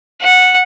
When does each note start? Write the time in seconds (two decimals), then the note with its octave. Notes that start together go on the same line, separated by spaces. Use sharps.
0.22 F#5